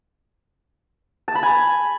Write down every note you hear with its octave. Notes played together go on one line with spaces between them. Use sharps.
A5
B5
G#5